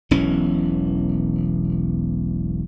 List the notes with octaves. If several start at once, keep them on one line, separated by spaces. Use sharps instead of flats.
E1 B1 E3 C#4